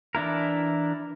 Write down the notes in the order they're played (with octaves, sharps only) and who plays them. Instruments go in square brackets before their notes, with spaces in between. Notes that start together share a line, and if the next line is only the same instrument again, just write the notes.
[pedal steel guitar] E3 D4 E4 A#4